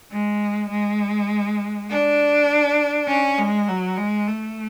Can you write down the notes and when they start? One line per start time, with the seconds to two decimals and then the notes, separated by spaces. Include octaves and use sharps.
0.12 G#3
0.70 G#3
1.90 D4
3.08 C#4
3.39 G#3
3.68 F#3
3.98 G#3
4.28 A3